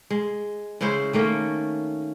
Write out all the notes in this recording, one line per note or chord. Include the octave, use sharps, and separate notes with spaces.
G#3
C#3 G#3 E4 C5
D#3 A3 A#3 C#4